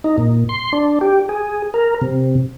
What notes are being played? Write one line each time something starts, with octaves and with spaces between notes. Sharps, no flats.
D#4
A#2
C6
D4
G4
G#4
A#4
C3